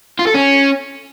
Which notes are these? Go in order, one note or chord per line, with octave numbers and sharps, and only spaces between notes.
F4
A4
C#4